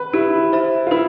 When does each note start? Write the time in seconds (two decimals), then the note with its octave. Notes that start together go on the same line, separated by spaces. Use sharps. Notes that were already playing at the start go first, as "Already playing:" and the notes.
Already playing: B4
0.13 E4 G4
0.52 C5 E5 B5
0.87 F4
0.91 E4 B4